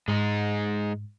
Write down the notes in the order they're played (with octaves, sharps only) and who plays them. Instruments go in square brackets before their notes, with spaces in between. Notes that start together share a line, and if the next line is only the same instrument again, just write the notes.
[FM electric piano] G#2 [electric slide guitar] G#3 D#4